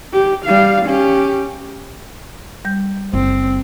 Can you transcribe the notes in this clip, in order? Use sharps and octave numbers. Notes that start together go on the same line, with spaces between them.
G4
G3 F5
C#4 G4
G3 G6
F#1 C4